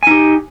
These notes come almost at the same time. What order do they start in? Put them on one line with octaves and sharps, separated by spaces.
G#5 D#4 G4